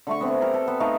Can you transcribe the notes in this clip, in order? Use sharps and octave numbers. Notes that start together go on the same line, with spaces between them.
D3 A3 C#6
B3 C4
G4 A4 A#4
A4
B3
A3 D#4 A#4 F5